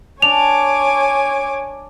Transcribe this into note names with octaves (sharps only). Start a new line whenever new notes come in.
D4 C#5 G#5 D6 F7